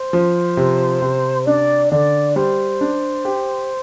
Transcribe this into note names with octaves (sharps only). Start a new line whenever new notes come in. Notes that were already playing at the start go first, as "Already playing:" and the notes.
Already playing: C5
F3
C3
C3
D4 D5
D3 D5
G3 C5
D4
G4